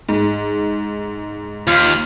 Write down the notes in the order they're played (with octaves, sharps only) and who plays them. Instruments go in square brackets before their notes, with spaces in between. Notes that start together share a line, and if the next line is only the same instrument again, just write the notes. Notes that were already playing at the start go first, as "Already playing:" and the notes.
[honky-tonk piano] G#2
[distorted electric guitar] D#2 [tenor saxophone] F4